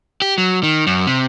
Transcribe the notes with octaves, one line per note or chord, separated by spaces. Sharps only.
G4
F#3
D#3
F#2
C3